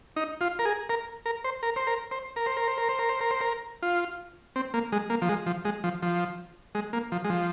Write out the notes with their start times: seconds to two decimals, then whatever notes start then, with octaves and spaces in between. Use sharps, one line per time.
0.16 D#4
0.41 F4
0.59 A#4
0.65 G#4
0.89 A#4
1.26 A#4
1.44 C5
1.63 A#4
1.76 C5
1.87 A#4
2.11 C5
2.36 A#4
2.46 C5
2.57 A#4
2.68 C5
2.78 A#4
2.89 C5
2.99 A#4
3.09 C5
3.21 A#4
3.31 C5
3.41 A#4
3.83 F4
4.56 C4
4.74 A#3
4.92 G#3
5.10 A#3
5.22 F3
5.29 G#3
5.46 F3
5.65 G#3
5.84 F3
6.02 F3
6.75 G#3
6.93 A#3
7.12 F3
7.24 G#3
7.30 F3